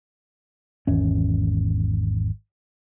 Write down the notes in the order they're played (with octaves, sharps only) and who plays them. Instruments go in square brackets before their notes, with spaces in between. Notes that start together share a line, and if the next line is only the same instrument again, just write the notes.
[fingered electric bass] G#1 E2 C#4